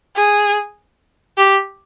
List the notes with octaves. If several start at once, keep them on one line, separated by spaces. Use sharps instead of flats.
G#4
G4